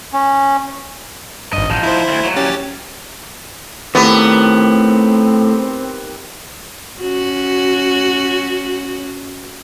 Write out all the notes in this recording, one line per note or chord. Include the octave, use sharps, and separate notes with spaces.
C#4
G#1 G2 D#5
A1 F3 D#4
E4 C5
D2 G#2
A#2 F#3
C#4 G4 A6
A2 D#3 B3 C4 G4
C#4 F#4